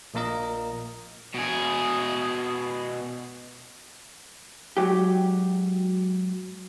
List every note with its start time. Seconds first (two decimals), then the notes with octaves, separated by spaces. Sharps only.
0.14 A#1 A#2 A#3 A#4 D#5
1.35 B2 G#4
4.77 G#2 F#3 G4